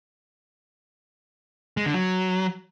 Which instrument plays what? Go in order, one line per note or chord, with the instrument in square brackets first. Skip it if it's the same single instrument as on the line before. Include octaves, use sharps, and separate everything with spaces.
[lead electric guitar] G#3
D3
F#3